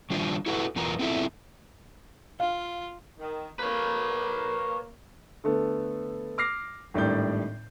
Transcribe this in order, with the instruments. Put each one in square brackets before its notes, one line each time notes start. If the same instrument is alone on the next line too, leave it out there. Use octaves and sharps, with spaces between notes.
[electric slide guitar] D#3 G3 D4 F4 C5
E4 F#4 A4 B4 F#5
E2 B3 F4 A#4 A#5
B3 C4 E4 F4 A4 E5
[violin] F4 [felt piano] F5
[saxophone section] D#3
[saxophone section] A#3 [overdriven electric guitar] B4 C#5
[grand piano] D3 A3 B3 A4
D6 F6 A#6 C7
G#1 A2 G3 D4 D5 G6